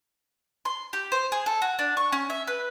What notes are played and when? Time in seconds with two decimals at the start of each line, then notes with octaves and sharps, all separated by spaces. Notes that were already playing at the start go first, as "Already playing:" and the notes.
0.65 C6
0.93 G4
1.12 C5
1.32 G#4
1.46 A4
1.62 F#4
1.79 D4
1.97 C#6
2.12 C#4
2.30 E5
2.47 B4